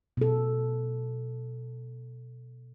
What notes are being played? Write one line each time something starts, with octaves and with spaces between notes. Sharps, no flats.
B2 A4